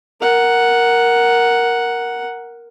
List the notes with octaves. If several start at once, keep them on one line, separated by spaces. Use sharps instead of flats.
A#4 F#5